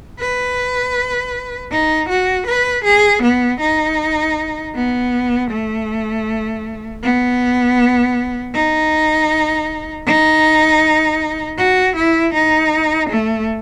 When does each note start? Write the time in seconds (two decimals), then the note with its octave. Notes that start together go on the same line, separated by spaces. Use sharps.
0.19 B4
1.71 D#4
2.09 F#4
2.47 B4
2.84 G#4
3.22 B3
3.60 D#4
4.75 B3
5.51 A3
7.02 B3
8.54 D#4
10.06 D#4
11.58 F#4
11.96 E4
12.34 D#4
13.09 A3